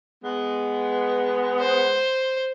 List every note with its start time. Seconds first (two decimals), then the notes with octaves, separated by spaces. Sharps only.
0.24 G#3 B3
1.60 C5